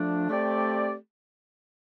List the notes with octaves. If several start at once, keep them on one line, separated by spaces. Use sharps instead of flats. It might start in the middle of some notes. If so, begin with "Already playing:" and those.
Already playing: F3 A3 D4
A3 C4 G4 D5